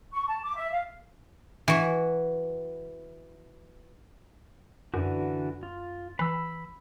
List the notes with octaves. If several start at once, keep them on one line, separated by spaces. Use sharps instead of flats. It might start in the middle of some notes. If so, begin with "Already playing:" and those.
C#6
A5
D6
E5
F5
E3 F#4
F#2 D3 E3 F#4
F4
E3 B5 E6